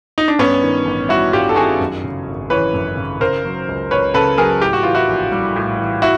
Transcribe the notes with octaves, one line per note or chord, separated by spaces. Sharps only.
D#4
D4
G2 B3 C#4
D#3
A1
G3 E4 F#4
G2 F4 G4
A4
D#3 F#4 G#4
F#2
C#3
G#1
E3 B4 C#5
F#2
C#3
C#3 A#4 C5
F#3
C#2
C#2 B4 C#5
C#3 A4 B4
F#3 G#4 A#4
A2 G4
F#4
E3 F4
E4 F#4
A#1
G3
A2
E3
E4 F#4